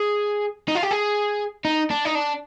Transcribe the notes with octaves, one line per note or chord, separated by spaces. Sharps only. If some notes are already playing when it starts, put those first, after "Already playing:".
Already playing: G#4
D#4
F4
G4
G#4
D#4
D4
D#4
D4